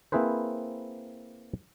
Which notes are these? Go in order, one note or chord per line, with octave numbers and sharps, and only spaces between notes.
A#3 C4 E4 G#4 B4 C5